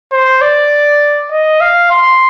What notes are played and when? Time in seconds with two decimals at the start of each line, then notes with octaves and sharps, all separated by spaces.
0.12 C5
0.42 D5
1.32 D#5
1.61 F5
1.91 C6